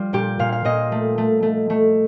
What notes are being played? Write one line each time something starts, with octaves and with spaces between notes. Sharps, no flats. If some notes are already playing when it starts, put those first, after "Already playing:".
Already playing: G3 F4
A#2 G4
A#2 F5
F5
A#2 D#5
A3
A3
A3
A3